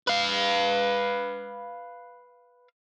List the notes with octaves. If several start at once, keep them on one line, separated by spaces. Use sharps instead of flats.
B4 F5